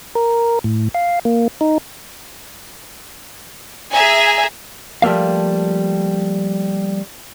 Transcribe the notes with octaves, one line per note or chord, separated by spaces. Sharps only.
A#4
A2
F5
A#3
D#4
G#4 E5 G#5 A#5
F3 G3 A3 A#3 F5